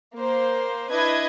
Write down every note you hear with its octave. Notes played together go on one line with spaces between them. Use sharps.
A#3 C5
D4 E4 B4 D#5 G#6